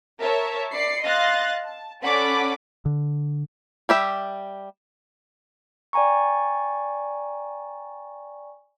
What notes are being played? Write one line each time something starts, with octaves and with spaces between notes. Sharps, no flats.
A#4 C#5 E5 A5
D5 B5 C7 C#7
D#5 F5 C6 F#6 A6 A#6
A5
C#4 A4 D5 F#5 B5 D6
D3
G3 G4 E5
D5 G5 G#5 A#5 C#6